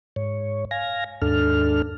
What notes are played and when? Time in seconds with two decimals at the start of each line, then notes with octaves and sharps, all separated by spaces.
0.16 G#2 C#5
0.71 F5 G#5 A#6
1.22 D#2 G#2 D4 A4 F6